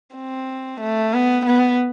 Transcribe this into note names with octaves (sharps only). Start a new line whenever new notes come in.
C4
A3
B3
B3